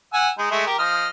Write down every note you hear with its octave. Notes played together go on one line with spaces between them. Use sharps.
F#5 G#5 E6
G#3 D#4
G#3 A3 E5
G4 A#4
F3 D#5 F6